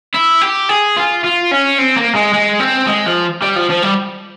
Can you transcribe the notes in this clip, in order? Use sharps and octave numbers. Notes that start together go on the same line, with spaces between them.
E4
G4
G#4
F4
F4
C#4
C4
A#3
G#3
G#3
C4
G#3
F3
G3
F3
F3
G3